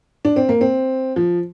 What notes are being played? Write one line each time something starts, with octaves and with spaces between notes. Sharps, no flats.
D4
C4
A#3
C4
F3